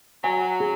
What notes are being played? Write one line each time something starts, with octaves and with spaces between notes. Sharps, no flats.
F#3 G#5
G#4